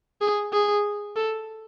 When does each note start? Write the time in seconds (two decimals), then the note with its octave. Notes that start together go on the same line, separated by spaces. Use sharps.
0.21 G#4
0.53 G#4
1.16 A4